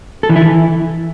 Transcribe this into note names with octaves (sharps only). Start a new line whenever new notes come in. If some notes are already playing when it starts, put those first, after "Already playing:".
A4
E3
E4
E3